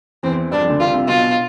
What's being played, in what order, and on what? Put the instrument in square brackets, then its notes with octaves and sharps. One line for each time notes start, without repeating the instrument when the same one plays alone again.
[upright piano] E2 E3 [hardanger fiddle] C4
[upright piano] G2 G3 [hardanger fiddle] D4
[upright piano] F2 F3
D2 D3
[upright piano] C2 C3 [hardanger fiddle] F4
[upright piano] C2 C3
[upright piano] B1 B2 [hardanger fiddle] F4